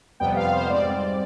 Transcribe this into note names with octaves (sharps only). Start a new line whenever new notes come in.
F2 C3 G3 B3 G5
F5
C5
G#2 G3 C4 D5